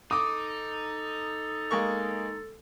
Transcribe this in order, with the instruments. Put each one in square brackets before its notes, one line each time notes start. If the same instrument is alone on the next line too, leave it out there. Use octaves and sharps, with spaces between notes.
[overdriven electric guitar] D#4 [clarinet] A4 [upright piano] D6 D#6
[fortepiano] G#3 A#3 C#6